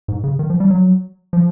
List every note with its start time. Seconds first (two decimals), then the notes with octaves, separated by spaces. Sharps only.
0.08 G#2
0.24 C#3
0.39 D#3
0.50 F3
0.60 G3
0.70 F#3
1.33 F3